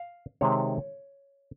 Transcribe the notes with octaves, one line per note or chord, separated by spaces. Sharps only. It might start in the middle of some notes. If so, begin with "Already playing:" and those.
Already playing: F5
C3 D#3 G#3 C4 C#5